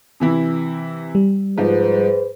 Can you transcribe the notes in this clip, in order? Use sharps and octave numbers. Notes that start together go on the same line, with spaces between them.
C3 E3 E4
G3
G#2 F3 G#4 B4 C5